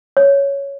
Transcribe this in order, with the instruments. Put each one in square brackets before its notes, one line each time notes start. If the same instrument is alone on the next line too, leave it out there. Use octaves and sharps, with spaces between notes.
[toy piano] C#5